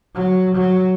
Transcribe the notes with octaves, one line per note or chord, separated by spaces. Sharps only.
F#3
F#3